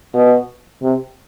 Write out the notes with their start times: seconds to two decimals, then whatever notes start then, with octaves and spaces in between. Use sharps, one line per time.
0.14 B2
0.82 C3